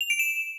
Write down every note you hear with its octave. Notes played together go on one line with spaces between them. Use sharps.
F7
D7
E7